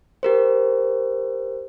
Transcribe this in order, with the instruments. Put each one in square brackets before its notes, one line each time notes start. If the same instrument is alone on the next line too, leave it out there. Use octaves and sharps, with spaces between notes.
[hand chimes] G4 A#4 C5